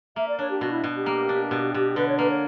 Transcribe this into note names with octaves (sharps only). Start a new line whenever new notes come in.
A#3 E5
D5
D4 C#5
G4
B2 F#4
E4
B2
G4
A#3
D4
B2
B2
D3 B4
C#5
A#3 B4
C#5